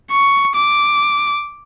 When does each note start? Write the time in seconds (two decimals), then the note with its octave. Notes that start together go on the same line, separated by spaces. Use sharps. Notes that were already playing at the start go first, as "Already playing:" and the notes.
0.11 C#6
0.55 D6